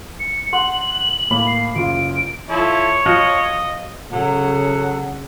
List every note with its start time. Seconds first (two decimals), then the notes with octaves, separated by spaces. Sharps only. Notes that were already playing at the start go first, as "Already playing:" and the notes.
0.20 C#7
0.53 F#5 C6 F#7
1.30 A2 A#3 B5
1.47 C7
1.75 F#1 F4 D7
2.50 F3 E4 A4 C#5
3.06 F3 F#4 D#5 F#5
4.12 C#3 F#3 A4 F#5